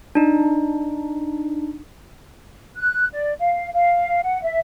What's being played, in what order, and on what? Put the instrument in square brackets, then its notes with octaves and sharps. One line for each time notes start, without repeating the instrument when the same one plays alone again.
[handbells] D4 D#4
[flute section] F#6
D5
F5
F5
F#5
E5